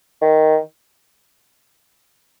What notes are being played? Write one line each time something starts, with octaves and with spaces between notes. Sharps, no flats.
D#3